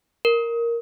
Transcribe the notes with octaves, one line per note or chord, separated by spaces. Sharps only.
A#4